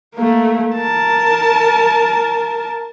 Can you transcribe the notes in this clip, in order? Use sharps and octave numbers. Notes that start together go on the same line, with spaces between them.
A3 A#3
A#4 A5